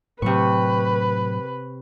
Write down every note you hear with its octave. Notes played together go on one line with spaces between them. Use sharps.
A2 C3 F#3 B4 C#6